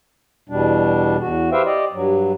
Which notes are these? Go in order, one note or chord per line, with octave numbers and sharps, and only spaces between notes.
E2 B2 G3 D4
E2 F#4
G4 B4 C5 E5 F5 G5
G4 D5 D#5
G2 F#3